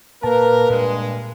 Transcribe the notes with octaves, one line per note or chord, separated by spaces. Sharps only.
A#2 A#3 A#4 B4 A5
G2 A#2 G#3